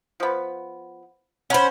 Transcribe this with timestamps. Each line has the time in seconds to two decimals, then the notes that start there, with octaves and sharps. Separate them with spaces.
0.20 F3 B3
1.50 C#4 C5 F#5 B5